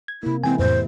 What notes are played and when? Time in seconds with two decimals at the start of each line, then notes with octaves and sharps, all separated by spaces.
0.08 G#6
0.23 C3 A#3 E4
0.43 E3 G#3 C4 E4 G#5
0.59 F2 A2 C5